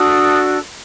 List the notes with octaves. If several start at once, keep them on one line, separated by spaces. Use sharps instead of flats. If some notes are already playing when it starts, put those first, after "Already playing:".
Already playing: D4 F#4 A4 D#6